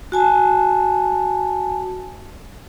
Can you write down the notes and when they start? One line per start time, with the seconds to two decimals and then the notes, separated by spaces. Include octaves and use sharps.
0.12 F#4 G#5 A5